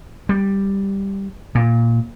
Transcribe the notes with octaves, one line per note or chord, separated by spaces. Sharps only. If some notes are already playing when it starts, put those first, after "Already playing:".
G3
A#2